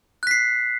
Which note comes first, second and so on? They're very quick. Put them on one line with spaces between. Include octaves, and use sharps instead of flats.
F#6 B6 C7